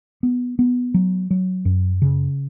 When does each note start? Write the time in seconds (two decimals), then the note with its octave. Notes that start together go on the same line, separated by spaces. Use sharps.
0.23 B3
0.59 B3
0.94 F#3
1.31 F#3
1.65 F#2
2.02 C#3